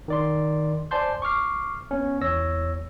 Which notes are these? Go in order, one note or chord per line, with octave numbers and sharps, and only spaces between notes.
D#3 D5 C6
C5 D5 G#5 A5 C6 G6
C#6 D6 F6 C7
B3 C#4
E2 C#5 E6 A#6